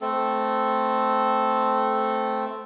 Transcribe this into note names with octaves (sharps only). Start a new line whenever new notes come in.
A3 C4 A4